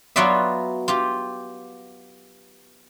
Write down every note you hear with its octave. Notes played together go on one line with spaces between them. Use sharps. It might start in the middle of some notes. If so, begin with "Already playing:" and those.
F#3 B3 F4 F#4 D5 E5
F4 G4